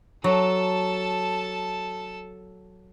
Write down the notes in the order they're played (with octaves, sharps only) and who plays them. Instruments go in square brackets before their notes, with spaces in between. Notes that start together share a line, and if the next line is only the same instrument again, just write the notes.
[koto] F#3 [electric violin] A4 A5